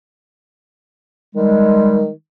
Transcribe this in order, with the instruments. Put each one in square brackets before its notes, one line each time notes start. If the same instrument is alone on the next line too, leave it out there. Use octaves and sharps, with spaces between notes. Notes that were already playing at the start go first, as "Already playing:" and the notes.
[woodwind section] D#3 G3 G#3